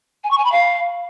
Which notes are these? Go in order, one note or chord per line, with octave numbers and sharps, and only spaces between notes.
G#5
C#6
G#5
B5
F5